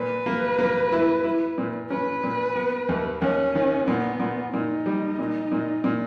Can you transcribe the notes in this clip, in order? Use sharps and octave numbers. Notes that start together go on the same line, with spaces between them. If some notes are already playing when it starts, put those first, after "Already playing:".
Already playing: A#2 B4
A#3
A#3
E4
E4
A#2
C#4 B4
A#2
B3
D#2
D#2 C#4
D#3
A#2 B3
A#2
A#2 D#4
G3
A#2
A#2
A#2